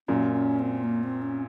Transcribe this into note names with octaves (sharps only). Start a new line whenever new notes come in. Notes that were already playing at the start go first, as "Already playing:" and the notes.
F#2 A#2 C#4
C#4
C4
A#3
C4
C#4